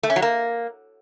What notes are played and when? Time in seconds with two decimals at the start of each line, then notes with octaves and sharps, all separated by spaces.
0.03 A3
0.10 C#4
0.16 F#3
0.22 A#3